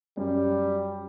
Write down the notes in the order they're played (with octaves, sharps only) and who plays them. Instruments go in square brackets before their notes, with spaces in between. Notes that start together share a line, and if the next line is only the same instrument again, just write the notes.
[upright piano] F#2 [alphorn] G3